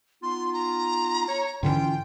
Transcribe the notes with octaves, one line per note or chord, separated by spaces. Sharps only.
B3 D#4 F4 C6
A#5
C#5
G#2 D3 E3 C#4 F4 G5